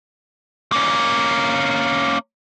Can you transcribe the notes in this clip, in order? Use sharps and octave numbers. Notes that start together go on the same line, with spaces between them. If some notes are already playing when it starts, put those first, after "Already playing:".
A#3 C#4